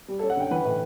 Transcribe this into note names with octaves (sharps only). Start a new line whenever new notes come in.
G3
C#4 A4
F#5
D3 G5
E3 B4
A2